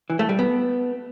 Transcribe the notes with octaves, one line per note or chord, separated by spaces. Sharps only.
E3
A3
G3
B3